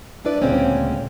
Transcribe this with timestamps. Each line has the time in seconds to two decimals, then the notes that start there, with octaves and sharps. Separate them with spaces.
0.25 D4 E4 B4 D5
0.42 D2 A#2 C#3 G#3 C4 C#4